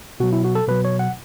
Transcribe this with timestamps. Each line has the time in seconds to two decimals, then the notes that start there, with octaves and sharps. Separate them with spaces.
0.20 B2 F#3 F#4
0.33 E4
0.44 F#4
0.55 A4
0.68 B2 F#3 B4
0.85 C#5
0.99 F#5